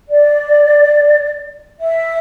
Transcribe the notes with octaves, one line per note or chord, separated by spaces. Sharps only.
D5
E5